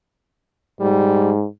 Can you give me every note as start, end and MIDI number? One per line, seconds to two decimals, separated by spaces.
0.81 1.45 44
0.81 1.31 55